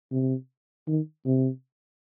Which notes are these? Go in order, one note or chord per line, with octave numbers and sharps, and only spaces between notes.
C3
D#3
C3